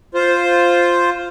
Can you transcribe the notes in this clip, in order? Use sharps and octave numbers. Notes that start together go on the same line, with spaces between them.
F4 C5